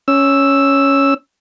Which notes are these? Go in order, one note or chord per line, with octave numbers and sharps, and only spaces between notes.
C#4 E6